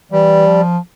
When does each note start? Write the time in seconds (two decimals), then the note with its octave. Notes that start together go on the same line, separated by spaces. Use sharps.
0.12 E3 G3
0.47 F3